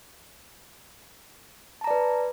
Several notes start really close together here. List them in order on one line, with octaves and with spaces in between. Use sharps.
A5 A#5 D5 B4